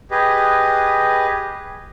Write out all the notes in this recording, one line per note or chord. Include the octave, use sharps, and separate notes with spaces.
G4 G#4 B4 D#5